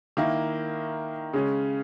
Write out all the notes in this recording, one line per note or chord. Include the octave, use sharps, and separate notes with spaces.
D#3 A#3 E4
C#3 G#3 C#4